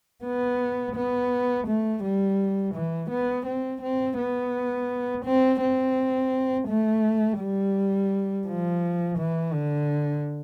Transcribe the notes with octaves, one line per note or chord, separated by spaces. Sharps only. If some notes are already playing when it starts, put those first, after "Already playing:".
B3
B3
A3
G3
E3
B3
C4
C4
B3
C4
C4
A3
G3
F3
E3
D3